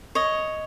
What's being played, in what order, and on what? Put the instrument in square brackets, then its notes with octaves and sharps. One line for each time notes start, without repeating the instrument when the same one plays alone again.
[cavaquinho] C#5 D#5